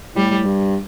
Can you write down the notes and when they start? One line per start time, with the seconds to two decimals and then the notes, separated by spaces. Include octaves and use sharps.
0.15 A2 G3
0.45 G2